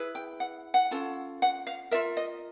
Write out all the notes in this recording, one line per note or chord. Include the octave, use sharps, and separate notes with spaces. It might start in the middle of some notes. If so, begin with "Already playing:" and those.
Already playing: E4 G#4 B4
G5
F#5
F#5
C#4 F4 A4
F#5
F5
F4 A#4 E5
D#5